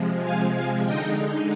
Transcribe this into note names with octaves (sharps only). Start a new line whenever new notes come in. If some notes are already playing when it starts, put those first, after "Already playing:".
Already playing: C3 F3 G#3
F5 G#5
F5 G#5
D3 G#3 D#4 D#5 G5